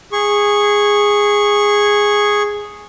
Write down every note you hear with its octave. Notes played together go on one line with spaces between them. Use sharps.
G#4 C#6